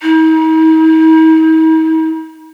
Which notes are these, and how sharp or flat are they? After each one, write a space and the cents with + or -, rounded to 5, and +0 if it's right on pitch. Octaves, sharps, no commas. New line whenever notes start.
D#4 +45